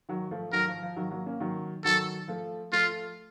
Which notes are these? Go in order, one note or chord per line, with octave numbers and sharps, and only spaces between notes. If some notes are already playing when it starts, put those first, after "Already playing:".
D#3 F#3
F3 A3
D#3 F#3 A#4
F3
F3
D#3 F#3
F#3 A#3
A#3 C#4
D#3 F#3
D#3 F#3 A4
F3 A3
F3 A3 F4